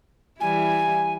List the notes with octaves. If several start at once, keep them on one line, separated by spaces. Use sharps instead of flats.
E3 G3 E4 G#5